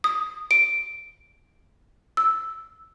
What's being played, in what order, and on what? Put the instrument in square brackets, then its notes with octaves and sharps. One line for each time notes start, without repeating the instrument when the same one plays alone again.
[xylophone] D#6
D7
E6